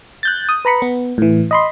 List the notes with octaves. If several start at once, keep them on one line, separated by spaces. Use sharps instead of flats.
F#6 G6 A6
D#6
B4 A#5 B5 C#7
B3
A2 E3
D#5 B5 C6